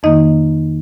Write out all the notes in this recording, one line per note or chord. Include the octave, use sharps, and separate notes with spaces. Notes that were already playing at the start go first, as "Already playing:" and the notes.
F2 D#3 A#3 D#4 D#5